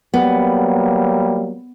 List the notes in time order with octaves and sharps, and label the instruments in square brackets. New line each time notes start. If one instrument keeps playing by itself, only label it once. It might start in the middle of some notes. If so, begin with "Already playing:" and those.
[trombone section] F#3 G3 A#3 [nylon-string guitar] B3